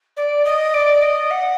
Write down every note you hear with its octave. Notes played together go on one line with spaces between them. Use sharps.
D5
D#5
D5
D#5
F#5